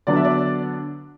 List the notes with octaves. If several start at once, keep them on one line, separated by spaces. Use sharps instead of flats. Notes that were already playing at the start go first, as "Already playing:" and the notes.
D3 F#3 B3 D4 D5
E5
D5